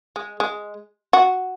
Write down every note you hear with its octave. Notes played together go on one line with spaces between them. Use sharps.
G#3
G#3
F#4